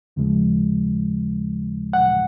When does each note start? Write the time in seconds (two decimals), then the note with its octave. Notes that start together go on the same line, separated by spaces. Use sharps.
0.16 D#2 C#3 F3 G#3
1.93 F#5